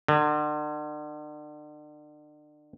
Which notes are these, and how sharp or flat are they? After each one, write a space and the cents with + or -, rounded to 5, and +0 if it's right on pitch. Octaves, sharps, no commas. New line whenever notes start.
D3 +35